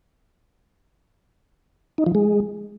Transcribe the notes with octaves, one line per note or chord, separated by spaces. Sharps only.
D#4
F3
G#3